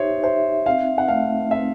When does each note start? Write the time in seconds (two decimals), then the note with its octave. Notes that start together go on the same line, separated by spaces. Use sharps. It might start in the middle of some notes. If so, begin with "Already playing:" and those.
Already playing: D#4 G4 C5 C#5 E5
0.24 C5 E5
0.66 C4 F5
0.98 F#5
1.08 A3 F5
1.51 C4 E5